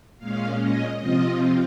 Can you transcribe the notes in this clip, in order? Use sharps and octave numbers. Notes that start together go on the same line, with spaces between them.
A#2 G#3 C#4 F5
D#5
C3 F3 C4 F4 D#5